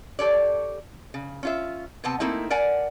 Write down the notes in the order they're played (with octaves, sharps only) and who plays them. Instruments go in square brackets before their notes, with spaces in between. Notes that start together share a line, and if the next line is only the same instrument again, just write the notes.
[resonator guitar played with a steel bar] G4 A4 C#5 D5
C#3
C#4 F4 E5
C3 B3 C4 A5
A3 A#3 C4 D#4 E4
A#4 D5 F#5 G#5